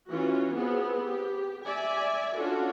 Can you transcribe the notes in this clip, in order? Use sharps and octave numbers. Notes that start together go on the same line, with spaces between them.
E3 C#4 F4 F#4
B3 C4 G#4
G4
D5 E5 G#5
C#4 D4 F4 F#4 A4